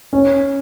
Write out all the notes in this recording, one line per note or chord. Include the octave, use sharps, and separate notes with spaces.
C#4